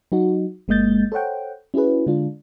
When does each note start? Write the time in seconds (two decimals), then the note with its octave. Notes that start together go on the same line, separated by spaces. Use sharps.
0.12 F#3 D#4 F#4
0.68 G1 G#3 A#3 D#5 G6 A6
1.12 A4 C5 C#5 F#5 G5
1.74 C#4 E4 F#4 G#4 B4
2.07 D3 G#3 D4 F4